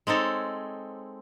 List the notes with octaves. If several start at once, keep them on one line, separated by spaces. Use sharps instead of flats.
G#3 C4 D#4 A4 C#5